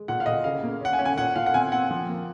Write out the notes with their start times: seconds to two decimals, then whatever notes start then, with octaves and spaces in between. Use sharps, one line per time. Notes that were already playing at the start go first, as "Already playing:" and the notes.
Already playing: G#3
0.08 A#2 F#5
0.20 F5
0.26 A#2 D#5
0.44 C#3 F5
0.63 A#3
0.81 C#4 F#5
0.93 G#5
0.99 C#4
1.05 G#5
1.18 A#2 F#5
1.36 A#2 F5
1.46 F#5
1.54 C4 G#5
1.72 C4 F#5
1.91 F3
2.08 A#3